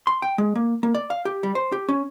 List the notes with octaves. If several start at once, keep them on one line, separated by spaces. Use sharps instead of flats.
C6
G5
G#3
A#3
A#3
D5
F5
G4
G3
C5
G4
C#4